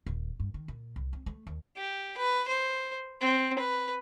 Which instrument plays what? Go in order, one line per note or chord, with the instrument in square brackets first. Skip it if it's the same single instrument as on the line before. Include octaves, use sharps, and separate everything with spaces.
[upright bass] D#1
G2
D#3
A#2
C2
C4
A3
D#2
[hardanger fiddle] G4
B4
C5
C4
B4